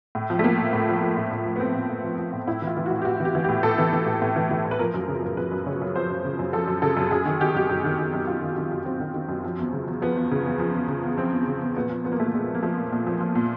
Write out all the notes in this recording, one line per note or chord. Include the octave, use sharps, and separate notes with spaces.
A2
F3
A3
F3 A#3
A2
A2
F3
F3
A2
A2
F3
B3
F3 C4
A2
A2
F3
F3
A2
A2 E4
E3 F4
E3
A2 F#4
G4
A2 F#4
E3
G4
E3
A2 G4
A2 A4
E3
E3
A2
A2
E3
E3
A2
B4
F3 A#4
F#2
C#3
F#2 A#4
F3 B4
F#2
C#3 C#5
F#2
F3 C5
F#2
C#3
F#2
F3 A4
F#2
C#3 A4
F#2
F#2 G#4
D#3
D#3 G4
G#4
F#2 G4
F#2
D#3
D#3
F#2
F#2 F4
D#3
D#3
F#2
F#2 C4
D#3
D#3
F#2
F3
E2
C#3
E2
F3 B3
E2
C#3
E2
F3
E2
C#3
E2
F3 C4
E2
C#3
E2
A#2 B3
F3
F3 B3
A#3
A#2 A3
A#3
A#2 G#3
F3
A#3
F3 A3
A#2
A#2
F3
F3
A#2